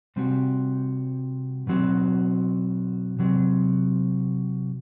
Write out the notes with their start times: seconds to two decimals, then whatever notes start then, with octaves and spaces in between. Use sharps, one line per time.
0.16 C3 G3 C4 F#4
1.67 B2 F#3 C4 F#4
3.19 C3 F#3 C4